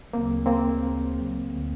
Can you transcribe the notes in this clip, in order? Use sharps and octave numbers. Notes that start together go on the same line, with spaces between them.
D2 C#3 F#3 A#3 C4
A#3 C4
D2 D3